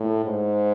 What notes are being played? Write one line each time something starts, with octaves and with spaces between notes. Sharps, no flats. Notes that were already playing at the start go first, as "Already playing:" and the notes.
Already playing: A2
G#2